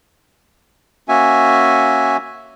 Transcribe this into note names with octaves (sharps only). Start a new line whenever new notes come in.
A#3 C#4 F#4 E5 G#5